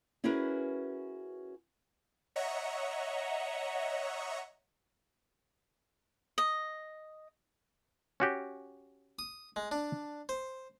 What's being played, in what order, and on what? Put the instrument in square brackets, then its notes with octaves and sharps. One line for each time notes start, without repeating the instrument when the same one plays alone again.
[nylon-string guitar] C#4 E4 F#4 G#4 A#4 B4
[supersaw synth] C#5 D#5 E5 F#5 A#5 C#6
[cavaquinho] D#5
[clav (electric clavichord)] C#4 F#4 G4
[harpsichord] D#6
G#3
D4
C5